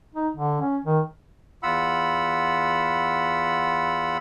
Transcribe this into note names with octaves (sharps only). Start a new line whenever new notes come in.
D#4
D3
C#4
D#3
E2 F4 F#5 B5 E6